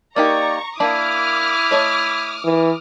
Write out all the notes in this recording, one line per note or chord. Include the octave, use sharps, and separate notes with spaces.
A#3 D#4 G4 D5 A#5 C#6
A#3 D4 E4 D5 D6 D#6 F6
A3 C#5 D#5
E3